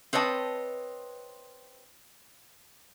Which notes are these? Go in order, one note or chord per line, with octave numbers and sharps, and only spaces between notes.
C4 B4 C#5 D#5 A5